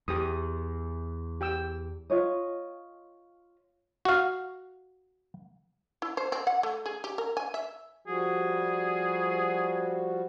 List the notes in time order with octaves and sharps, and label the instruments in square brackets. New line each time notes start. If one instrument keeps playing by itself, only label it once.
[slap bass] E2 [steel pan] G4 D#6
[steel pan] G4 G5 E6
[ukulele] F4 C#5 D#5
[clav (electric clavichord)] F#4 F5
[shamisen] E4
C5
C4
F#5
A3
G#4
G4
A#4
G#5
E5
[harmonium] F3 G3 F#4 [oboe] G#4